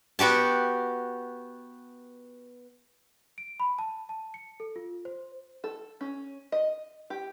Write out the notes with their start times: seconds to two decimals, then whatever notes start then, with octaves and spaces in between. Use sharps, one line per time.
0.19 B3 F#4 G4 A5
3.38 D7
3.60 B5
3.79 A5
4.09 A5
4.34 C#7
4.60 A4
4.76 F4
5.05 C5
5.64 A4
6.01 C#4
6.52 D#5
7.10 G4